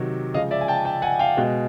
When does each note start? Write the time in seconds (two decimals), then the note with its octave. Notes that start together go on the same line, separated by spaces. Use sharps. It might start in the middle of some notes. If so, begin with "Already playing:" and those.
Already playing: C3 D#3 F#3
0.34 C#3 F3 G#3 D#5 F5
0.51 D5 E5
0.61 G#5
0.68 G5 A5
0.85 G5 A5
1.02 F#5 G#5
1.19 F5 G5
1.37 B2 G#3